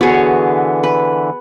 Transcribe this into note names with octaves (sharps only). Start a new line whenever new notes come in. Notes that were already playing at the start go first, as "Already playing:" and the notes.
D3 E3 B3 F#4 G#4 C#5
B4